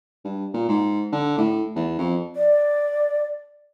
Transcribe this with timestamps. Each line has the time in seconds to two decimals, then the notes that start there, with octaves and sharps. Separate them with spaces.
0.25 G2
0.53 A#2
0.68 G#2
1.12 D3
1.38 A2
1.76 E2
1.99 F2
2.36 D5